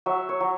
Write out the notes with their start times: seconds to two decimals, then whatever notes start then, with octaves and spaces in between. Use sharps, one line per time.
0.06 F#3 E5
0.29 C#5
0.40 F#3